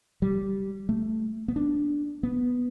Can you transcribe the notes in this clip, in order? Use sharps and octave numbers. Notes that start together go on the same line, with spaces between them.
G3
A3
B3
D4
B3